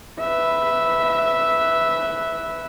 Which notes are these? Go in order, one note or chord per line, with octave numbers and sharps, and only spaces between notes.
B4 E5